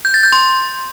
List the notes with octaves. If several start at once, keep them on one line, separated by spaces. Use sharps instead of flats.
G6
A6
G6
C6